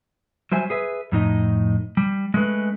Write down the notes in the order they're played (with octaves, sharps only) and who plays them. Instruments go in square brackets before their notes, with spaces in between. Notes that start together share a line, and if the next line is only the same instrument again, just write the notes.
[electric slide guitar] F#3 G3 C5 E5 G#5
G#4 B4 E5
F2 A2 D#4 D#5
G3
G#3 A3 C#4 B4